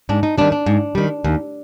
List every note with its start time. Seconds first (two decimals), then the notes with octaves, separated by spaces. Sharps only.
0.09 G#2 D4
0.23 D#4
0.38 D#3 G3 D4
0.52 D4
0.66 G#2
0.95 D#3 G3
1.24 D#2